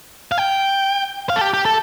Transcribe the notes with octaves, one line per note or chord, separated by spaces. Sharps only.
F5
G5
F5
A4
G4
G4
A4